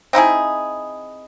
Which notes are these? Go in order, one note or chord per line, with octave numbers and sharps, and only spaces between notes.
C4 D#4 E4 G#4